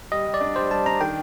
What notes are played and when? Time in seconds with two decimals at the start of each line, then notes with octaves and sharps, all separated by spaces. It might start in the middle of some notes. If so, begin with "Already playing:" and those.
0.12 G3 D#5
0.27 G3
0.34 D5
0.41 D4
0.56 G3 C5
0.71 G3 A5
0.86 D4 A#5
1.01 D#3 G5